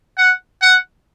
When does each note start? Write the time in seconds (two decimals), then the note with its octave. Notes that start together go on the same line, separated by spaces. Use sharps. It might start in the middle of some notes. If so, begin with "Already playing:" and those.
0.17 F#5
0.61 F#5